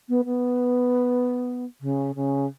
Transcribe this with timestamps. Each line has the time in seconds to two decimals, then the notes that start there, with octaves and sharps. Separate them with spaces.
0.09 B3
0.25 B3
1.81 C#3
2.15 C#3